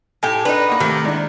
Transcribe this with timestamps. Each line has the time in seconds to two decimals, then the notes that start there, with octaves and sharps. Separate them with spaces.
0.23 A2 G4 G#5
0.45 D4 D#4 B4
0.69 A#3 D#5 F#5
0.80 C3 D#3 A3
1.04 G#3 D4 E4